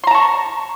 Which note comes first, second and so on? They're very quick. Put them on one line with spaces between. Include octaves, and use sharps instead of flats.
C6 A#5 A5 C#6